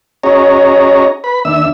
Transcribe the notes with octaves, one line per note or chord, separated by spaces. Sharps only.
C#4 F#4 G#4 C#5 D#5 A#5
B4 B5
D#2 D4 E5 E6